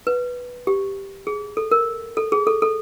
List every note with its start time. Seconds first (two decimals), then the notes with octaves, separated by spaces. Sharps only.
0.07 B4
0.67 G4
1.27 G#4
1.57 A4
1.71 A#4
2.17 A4
2.32 G#4
2.47 A4
2.62 A4